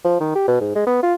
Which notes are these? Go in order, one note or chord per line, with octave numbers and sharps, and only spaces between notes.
F3
D#3
G4
B2
G#2
G#3
B3
F4